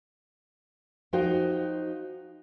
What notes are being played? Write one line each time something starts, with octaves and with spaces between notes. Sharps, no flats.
F3 D#4 F#4 C5 G5